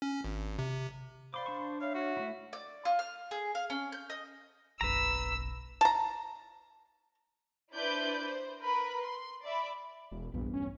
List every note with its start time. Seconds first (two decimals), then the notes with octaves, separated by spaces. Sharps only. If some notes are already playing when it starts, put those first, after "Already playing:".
0.02 C#4
0.24 G#1
0.59 C3
1.34 C5 D5 F5 B5 C6 D6
1.46 D4 A5 C#6
1.81 C#5 E5 F5
1.95 F#4 C#5
2.17 A3 E4
2.53 D5
2.85 F4
2.99 F6
3.31 G#4
3.55 F5
3.70 C#4
3.92 G6
4.10 D#5
4.81 F#1 B1 B4 A#5 E6
5.81 A5 A#5
7.73 D4 E4 B4 C5 D5 G6
8.24 C5
8.63 A#4 B4 B5
9.05 C6
9.44 D5 E5 B5
10.11 E1
10.34 A#1 E2 G2 B3
10.53 C#4